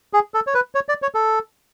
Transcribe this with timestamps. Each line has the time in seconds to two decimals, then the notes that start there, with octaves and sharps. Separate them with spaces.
0.13 G#4
0.34 A4
0.47 C#5
0.54 B4
0.75 C#5
0.89 D5
1.02 C#5
1.15 A4